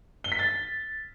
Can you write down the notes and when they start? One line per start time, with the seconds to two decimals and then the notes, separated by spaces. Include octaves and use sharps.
0.24 G7
0.32 B6
0.39 A6